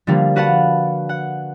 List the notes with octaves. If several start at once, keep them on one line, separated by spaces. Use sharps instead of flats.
D3 F3 G3 A#3
F#4 B4 F5 F#5 A5 B5
F#5